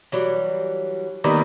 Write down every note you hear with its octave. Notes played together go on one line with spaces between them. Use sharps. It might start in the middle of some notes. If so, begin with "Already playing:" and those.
E3 F#3 G3
D#3 G3 A#3 B3